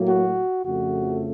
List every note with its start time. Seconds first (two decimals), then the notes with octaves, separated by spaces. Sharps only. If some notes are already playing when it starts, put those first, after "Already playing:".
Already playing: A2 F#3 A#3
0.08 F#4
0.64 F2 C#3 F3 A3 F#4